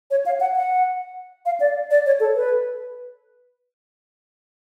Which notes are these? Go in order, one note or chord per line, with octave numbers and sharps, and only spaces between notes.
C#5
F5
F#5
F#5
F5
D5
D5
C#5
A4
B4